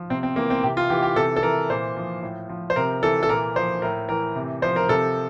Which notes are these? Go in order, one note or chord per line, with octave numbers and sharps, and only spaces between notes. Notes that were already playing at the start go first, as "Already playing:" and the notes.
Already playing: F3
C3 C4
C4
E3 A#3
C4
C3 G4
F4
E3 G4
G4
C3 A4
A4
E3 A#4
A#2 C5
F3
A2
F3
C5
C3 A#4
E3 A4
A4
A#2 A#4
F3 C5
A2 A#4
E3 A#4
C3
F3 C5
A#4
C3 A4